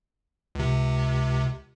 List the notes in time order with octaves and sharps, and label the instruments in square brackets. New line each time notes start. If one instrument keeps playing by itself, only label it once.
[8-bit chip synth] C#2 C3